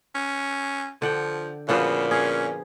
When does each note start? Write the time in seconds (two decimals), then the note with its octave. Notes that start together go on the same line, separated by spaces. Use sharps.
0.15 C#4
1.02 D3 F3 F#5 G5
1.69 A#2 C#3 F3 B3 F#4
2.11 C#4 G#4